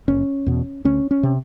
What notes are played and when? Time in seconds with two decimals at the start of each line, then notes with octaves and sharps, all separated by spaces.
0.08 F#1 C#4
0.46 E2 B2
0.85 D2 C#4
1.11 C#4
1.23 C3